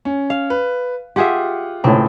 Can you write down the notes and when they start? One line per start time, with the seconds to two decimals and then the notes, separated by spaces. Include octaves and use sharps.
0.05 C#4
0.30 F5
0.50 B4
1.16 F4 G4 G#4 E5 F#5 C6
1.84 C#2 A2 C4